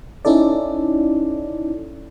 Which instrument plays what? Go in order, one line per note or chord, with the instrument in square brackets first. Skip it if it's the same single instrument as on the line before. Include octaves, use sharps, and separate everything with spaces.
[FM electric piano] C#4 D#4 E4 A4 D5